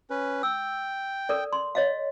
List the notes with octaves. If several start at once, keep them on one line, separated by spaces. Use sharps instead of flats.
C#4 B4
G5 E6
A4 A#4 D5
C6
C#5 D#5 F5